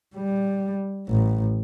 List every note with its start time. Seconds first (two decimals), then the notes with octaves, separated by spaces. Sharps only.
0.16 G3
1.09 A1